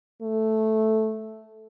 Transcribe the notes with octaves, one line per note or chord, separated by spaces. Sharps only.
A3